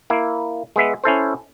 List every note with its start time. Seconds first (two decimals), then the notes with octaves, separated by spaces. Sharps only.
0.10 A#3 E4
0.76 G#3 B3 E5
1.04 C#4 E4 A4 C5